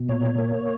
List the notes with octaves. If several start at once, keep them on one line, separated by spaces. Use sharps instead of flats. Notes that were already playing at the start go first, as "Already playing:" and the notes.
Already playing: B2
A#2 C#5
A#3